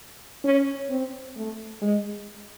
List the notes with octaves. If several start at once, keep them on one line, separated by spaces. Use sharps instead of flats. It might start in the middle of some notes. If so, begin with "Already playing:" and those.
C#4
C4
A3
G#3